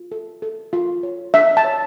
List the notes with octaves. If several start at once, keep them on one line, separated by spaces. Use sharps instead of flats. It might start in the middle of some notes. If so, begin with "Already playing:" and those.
Already playing: F4
A4
A4
F4
C#5
D4 E5
A5
C#5